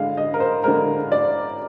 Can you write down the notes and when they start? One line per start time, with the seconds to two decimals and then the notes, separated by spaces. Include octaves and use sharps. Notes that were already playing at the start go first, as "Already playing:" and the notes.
Already playing: D3 G#3 F5
0.17 D#5
0.34 A#4
0.40 C5
0.64 D3 G#3 A#4
1.12 D5